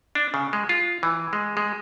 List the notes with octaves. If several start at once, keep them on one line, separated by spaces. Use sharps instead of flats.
D4
C#3
G#3
F4
E3
G#3
G#3